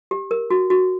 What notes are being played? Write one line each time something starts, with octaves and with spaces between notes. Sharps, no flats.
G4
A#4
F#4
F#4